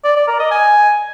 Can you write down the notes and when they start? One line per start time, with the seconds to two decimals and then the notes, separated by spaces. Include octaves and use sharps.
0.04 D5
0.16 D5
0.28 A#4
0.39 D#5
0.51 G#5